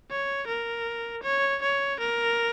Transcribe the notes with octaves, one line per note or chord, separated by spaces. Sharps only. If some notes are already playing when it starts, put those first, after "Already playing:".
C#5
A#4
C#5
C#5
A#4